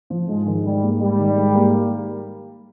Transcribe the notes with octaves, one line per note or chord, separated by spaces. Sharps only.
F3
G#2 G#3
D#3
G#2 G3
A#3
G#2 G3
D#3
G#2
A#3